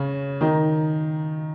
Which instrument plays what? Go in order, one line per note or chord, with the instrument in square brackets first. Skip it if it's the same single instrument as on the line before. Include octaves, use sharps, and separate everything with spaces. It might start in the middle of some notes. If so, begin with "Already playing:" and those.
Already playing: [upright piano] C#3 C#4
D#3 D#4